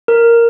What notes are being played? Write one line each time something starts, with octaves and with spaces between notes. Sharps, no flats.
A#4